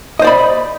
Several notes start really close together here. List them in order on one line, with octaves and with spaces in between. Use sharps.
D#5 C5 D5 B5